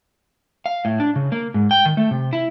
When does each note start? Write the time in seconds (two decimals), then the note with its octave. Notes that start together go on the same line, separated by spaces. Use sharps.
0.66 F5
0.85 A2
1.00 D4
1.16 C#3
1.32 A#3
1.54 G#2
1.71 G5
1.85 D#3
1.97 A3
2.11 C3
2.33 E4